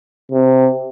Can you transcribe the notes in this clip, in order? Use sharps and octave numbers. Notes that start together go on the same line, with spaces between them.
C3